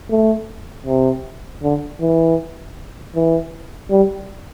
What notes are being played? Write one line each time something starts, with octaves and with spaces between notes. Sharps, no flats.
A3
C3
D3
E3
E3
G3